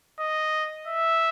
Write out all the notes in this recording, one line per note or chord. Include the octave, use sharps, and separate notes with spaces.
D#5
E5